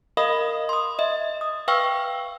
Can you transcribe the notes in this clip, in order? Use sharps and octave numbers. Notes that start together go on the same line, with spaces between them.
A#4 D#5 F5 B5 D#6
C6 D#6
D#5 E5
D#6
B4 F5 G5 C#6 E6 F6